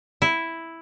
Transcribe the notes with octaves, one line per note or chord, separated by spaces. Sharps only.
E4